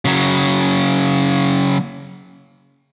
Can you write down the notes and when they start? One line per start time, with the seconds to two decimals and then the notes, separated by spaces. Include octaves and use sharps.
0.05 C#3 F#3